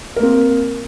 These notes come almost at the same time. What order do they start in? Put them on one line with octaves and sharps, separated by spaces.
A#4 A#3 C4